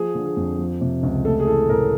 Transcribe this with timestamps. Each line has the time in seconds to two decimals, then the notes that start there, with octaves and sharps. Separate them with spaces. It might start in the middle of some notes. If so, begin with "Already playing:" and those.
Already playing: F3 G#4
0.15 D3
0.26 G#4
0.37 F2
0.59 F3
0.81 C3
1.03 C#2
1.25 A3 A4
1.40 G#4
1.47 E3 A4
1.69 A2 A#4